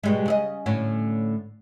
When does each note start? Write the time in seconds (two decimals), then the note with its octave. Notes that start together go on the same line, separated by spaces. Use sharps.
0.03 B2 G3 G#3
0.26 C#3 G#4 D#5
0.66 A2 D3 C#4